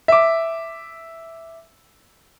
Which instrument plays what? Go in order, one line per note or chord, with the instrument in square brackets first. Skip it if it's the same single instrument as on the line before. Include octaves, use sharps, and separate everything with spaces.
[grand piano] E5 D6